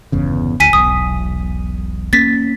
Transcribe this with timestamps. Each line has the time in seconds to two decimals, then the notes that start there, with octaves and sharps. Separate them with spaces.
0.12 G1 E2 C#3
0.60 D2 G#5 B6 D#7
0.73 E1 B1 D#6
2.13 A#3 C#4 A6 B6